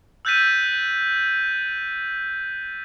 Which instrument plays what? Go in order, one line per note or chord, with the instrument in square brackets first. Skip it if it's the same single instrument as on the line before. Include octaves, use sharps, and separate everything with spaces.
[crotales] E6 F#6 G6 A6 B6 D#7